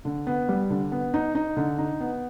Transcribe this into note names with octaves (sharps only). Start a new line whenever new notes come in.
D3
B3
G3
D3
B3
D#4
D#4
D3
D#4
B3